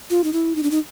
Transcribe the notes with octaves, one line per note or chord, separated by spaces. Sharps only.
F4
D#4
E4
D#4
D4
D#4